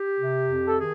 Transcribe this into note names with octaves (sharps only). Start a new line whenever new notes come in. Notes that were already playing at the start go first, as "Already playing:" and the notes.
Already playing: G4
C3
F2
A4
D#3 G#4